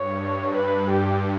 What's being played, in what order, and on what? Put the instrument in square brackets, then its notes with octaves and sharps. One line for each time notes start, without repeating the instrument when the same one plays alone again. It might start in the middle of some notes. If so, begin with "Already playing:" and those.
Already playing: [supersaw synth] G2 [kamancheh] C#5
[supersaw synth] G2
[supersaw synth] G2 [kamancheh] B4
[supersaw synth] G2 [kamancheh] G4